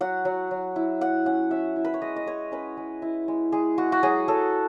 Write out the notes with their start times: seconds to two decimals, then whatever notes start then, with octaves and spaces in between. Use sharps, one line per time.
0.01 F#3 F#5
0.25 F#3
0.51 F#3
0.76 E4
1.01 F#3 F#5
1.26 C#4 F#5
1.51 C#4 E5
1.76 E4
1.85 B4
1.94 C#5
2.02 G#3 D#5
2.16 D#5
2.26 G#3 C#5
2.52 C#4 B4
2.77 G#3
3.02 E4
3.28 G#3
3.52 G#3 G#4
3.78 G#3 F#4
3.92 F#4
4.03 F#3 G#4
4.28 F#3 A4